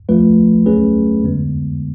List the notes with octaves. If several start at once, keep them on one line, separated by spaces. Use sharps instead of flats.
F3 A3 F4 B4
F#3 A3 C#4 G#4 B4
F2 D3 G#3 B3